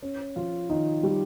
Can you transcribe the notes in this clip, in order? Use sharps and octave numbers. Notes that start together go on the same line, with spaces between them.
C#4
F3 F4
D#3 D#4
G3 G4